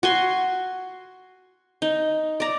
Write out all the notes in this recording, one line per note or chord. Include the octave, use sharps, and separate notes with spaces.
F#4 G#5 C6
D#4
D5 A#5